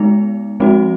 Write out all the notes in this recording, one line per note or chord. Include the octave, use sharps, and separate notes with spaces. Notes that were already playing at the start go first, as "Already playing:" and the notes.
Already playing: G#3 B3 D#4
F3 G#3 C4 D#4 F#4